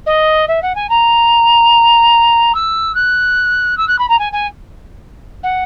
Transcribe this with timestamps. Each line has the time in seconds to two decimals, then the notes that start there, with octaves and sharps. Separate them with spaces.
0.06 D#5
0.48 E5
0.62 F#5
0.75 G#5
0.89 A#5
2.55 E6
2.95 F#6
3.77 E6
3.88 F#6
3.99 B5
4.09 A#5
4.19 G#5
4.33 G#5
5.43 F#5